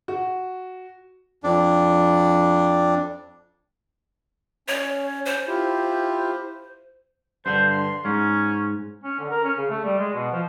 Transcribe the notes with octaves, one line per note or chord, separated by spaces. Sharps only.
F#4
F2 D4
C#4 C#5
C5
E4 F4 G4
G2 D3 C5
C6
G#2 C#4
C#4
D3
A#4
C#4
C#3
A3
G3
G#3
B2
F3